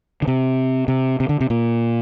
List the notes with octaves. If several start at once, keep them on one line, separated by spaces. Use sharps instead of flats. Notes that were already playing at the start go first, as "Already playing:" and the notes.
D3
C3
C3
C3
D3
C3
A#2